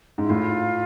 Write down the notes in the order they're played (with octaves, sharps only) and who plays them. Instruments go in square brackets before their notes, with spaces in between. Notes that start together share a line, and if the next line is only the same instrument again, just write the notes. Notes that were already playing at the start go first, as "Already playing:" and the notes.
[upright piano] G#2 [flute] E4
[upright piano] A2 [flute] F4